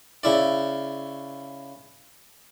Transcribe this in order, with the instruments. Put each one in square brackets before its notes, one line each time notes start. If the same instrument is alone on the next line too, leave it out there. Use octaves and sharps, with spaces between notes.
[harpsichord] C#3 E4 D5